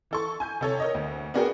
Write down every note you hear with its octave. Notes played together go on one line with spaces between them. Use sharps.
E3 A4 C#6
G#5 G6
C3 A4 C#5
A#4 C#5 D#5
D2
B3 D4 F#4 G#4 A#4 G5